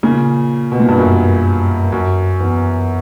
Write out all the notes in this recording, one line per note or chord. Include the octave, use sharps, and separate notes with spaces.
A#2 C#3
B2
A#2
G2
F#2
F#2
E2